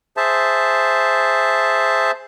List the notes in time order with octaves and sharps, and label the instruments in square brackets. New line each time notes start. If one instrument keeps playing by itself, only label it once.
[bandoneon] G#4 C5 E5 A5